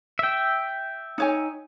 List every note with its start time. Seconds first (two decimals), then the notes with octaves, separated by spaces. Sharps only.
0.19 E5 G5
1.18 D#4 C#5 G#5